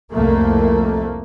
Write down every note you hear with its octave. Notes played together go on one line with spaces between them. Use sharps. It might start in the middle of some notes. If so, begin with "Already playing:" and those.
C2 F2 A3 A#3